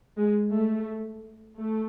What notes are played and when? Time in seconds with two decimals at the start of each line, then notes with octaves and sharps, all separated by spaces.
0.17 G#3
0.53 A3
1.58 A3